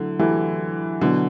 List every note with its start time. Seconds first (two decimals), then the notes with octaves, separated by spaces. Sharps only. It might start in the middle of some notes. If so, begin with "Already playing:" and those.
Already playing: D3 F#3 A3 E4
0.19 E3 F#3 A3 E4 G4
1.01 B2 D3 F#3 B3 E4